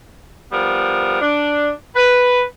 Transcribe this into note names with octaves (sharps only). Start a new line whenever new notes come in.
F3 G3 B3 A#4
D4
B4